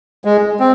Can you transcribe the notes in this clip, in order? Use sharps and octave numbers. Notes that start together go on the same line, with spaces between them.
G#3
C4